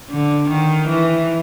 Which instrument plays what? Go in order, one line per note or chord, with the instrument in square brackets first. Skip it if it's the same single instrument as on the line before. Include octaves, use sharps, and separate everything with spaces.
[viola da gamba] D3
D#3
E3